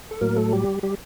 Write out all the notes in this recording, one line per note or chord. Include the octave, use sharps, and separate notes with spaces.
A4
A2 F#3 A#3 A#4
A3 A4
G3 G4
G3 G4